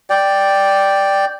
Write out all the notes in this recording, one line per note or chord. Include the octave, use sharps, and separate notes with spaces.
D5 G5